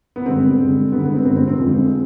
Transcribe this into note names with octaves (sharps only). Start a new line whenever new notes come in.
B3
G2 D3 G#3 C4
G2 D3 G#3
G2 D3 G#3 B3
B3
C4
G2 D3 G#3 C4
C4
C4
F2 D3 F3 G#3